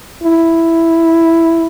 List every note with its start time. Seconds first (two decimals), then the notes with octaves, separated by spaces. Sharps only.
0.23 E4